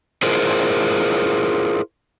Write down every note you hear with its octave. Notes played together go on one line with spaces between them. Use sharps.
E4 F4 G#4 A#4 C5